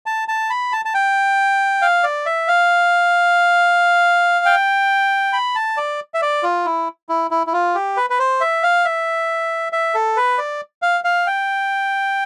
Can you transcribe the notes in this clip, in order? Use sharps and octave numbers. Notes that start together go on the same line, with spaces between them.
A5
A5
B5
A5
A5
G5
F5
D5
E5
F5
G5
B5
A5
D5
E5
D5
F4
E4
E4
E4
E4
F4
G4
B4
B4
C5
E5
F5
E5
E5
A4
B4
D5
F5
F5
G5